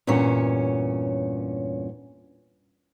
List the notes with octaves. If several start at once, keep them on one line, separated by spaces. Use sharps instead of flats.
E2 G2 A#2 C#4 C#5